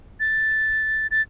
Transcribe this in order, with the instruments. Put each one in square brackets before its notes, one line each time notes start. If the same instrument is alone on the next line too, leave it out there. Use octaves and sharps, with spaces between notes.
[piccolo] A6
A6